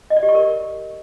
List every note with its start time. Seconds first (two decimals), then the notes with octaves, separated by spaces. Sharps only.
0.10 D#5
0.17 D5
0.23 G4
0.29 C#6
0.35 A#4